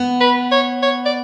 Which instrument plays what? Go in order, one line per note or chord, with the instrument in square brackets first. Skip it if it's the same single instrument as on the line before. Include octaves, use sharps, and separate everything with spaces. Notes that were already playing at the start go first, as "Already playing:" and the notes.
Already playing: [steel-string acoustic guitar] B3
[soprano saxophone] B4
C#5
C#5
D5